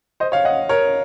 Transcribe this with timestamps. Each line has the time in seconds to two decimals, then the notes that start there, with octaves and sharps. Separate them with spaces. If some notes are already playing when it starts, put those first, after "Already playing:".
0.20 C5 D#5
0.32 C#5 F5
0.45 D#5 F#5
0.69 A#4 C#5